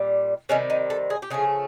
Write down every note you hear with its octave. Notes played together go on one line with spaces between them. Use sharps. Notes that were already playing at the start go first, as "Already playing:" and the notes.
Already playing: A#2 G3
C3 D#3 G3 C#4
D#4
A4
G#4
G4
C#3 F3 A3 G#4